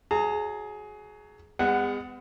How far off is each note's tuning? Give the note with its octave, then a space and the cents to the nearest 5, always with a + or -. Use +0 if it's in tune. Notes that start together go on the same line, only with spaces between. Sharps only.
F#3 +20 G#4 +20 A#5 -30
G#3 -35 B3 +30 F#5 +0